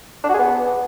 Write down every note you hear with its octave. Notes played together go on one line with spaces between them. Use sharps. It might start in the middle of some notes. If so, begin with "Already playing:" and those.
D4
F#4
G#4
B3